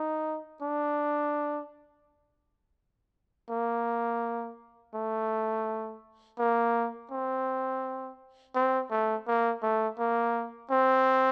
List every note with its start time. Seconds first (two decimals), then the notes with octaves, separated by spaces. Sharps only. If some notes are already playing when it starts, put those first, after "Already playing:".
Already playing: D#4
0.62 D4
3.50 A#3
4.95 A3
6.39 A#3
7.11 C4
8.55 C4
8.91 A3
9.27 A#3
9.63 A3
9.99 A#3
10.71 C4